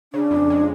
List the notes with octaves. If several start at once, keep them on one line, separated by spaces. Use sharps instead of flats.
C#3 D4
F2
G#3